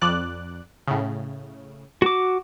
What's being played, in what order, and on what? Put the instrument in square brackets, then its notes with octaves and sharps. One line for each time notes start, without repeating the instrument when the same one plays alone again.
[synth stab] F2 D5 F#6
A2 C#3
[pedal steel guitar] F#4 D6